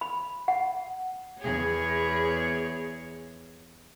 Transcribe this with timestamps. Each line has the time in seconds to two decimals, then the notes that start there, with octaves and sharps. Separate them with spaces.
0.01 B5
0.48 F#5
1.39 E2 G#4 C#5